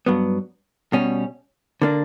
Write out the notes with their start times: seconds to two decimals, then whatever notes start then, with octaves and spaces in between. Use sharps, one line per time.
0.06 G2 F#3 B3
0.93 B2 G3 C#4
1.82 D3 A#3 D4